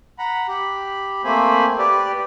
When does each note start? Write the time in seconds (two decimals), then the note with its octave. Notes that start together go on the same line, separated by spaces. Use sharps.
0.19 F#5 A#5 B5
0.48 G4 B5
1.24 A3 A#3 C4 C5 G#5 B5
1.79 G4 B4 D5